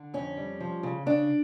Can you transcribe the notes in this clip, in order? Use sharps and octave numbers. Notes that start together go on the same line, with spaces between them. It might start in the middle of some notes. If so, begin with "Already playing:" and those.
Already playing: D3
F2 C#4
G3
F3
C#3
C#3 D4